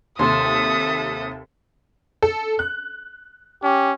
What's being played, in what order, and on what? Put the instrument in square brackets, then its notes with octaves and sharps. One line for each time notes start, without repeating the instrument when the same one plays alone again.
[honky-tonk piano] D#2 C3 [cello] A4 E5 [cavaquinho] C6 [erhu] D#6
[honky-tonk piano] A4
F#6
[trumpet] C#4 [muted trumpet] G4